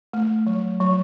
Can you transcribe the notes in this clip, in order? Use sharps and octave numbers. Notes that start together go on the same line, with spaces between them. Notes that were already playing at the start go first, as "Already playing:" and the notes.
A3
F#3
F#3